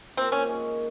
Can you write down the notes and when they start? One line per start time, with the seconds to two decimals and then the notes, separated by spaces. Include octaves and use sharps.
0.17 C3 F3 A#3 C4
0.32 C#4
0.46 D#3 G#3 C#4